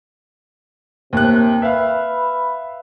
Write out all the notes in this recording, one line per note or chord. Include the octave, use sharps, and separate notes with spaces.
D#2 C3 F#6
B4 E5 F5